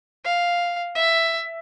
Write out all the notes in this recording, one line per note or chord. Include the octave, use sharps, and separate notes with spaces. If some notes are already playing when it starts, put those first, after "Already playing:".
F5
E5